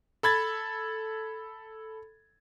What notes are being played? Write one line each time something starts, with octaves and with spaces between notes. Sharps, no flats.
A4 B5 G#6 A6